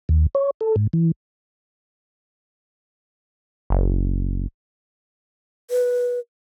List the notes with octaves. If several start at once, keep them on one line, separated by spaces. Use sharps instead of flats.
D#2
C#5
A4
G#2
E3
F#1
B4